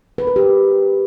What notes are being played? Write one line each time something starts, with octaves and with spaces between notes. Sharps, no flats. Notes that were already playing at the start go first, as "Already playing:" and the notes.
B4
A#4
G4